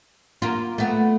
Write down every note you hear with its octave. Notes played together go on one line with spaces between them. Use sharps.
A#3 F4
A3 B3